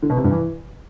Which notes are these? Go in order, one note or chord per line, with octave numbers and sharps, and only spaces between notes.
D3
B2
C3
G2
E3